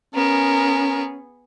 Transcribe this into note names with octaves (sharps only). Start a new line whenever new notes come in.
B3 C#4 G#4 A#4